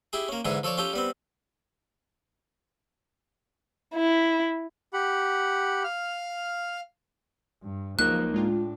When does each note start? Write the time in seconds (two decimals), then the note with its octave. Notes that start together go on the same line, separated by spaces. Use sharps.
0.13 E4 G4 G#4
0.29 A#3 C#4
0.45 G#2 D3 E3 G#3 G#4
0.63 F3 A4 C#5 D5 A5
0.78 C#4 F4 G4 A4 G5
0.93 G3 B3 C4
3.95 E4
4.93 G4 F#5 B5
5.84 F5 F6
7.62 G2
7.99 C#2 F3 F#3 A#3 D#4 A#4 F#6
8.34 A2 G#3 D4 F4 G5